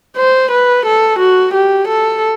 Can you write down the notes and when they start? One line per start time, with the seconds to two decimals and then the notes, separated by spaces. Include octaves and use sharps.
0.17 C5
0.51 B4
0.86 A4
1.19 F#4
1.54 G4
1.88 A4